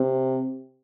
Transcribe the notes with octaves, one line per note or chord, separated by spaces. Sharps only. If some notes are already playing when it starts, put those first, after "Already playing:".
Already playing: C3